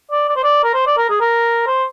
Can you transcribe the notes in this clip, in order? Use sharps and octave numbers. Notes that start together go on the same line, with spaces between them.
D5
D5
C5
D5
A#4
C5
D5
A#4
G#4
A#4
C5